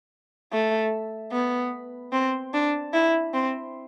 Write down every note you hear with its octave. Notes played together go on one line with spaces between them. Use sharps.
A3
B3
C4
D4
E4
C4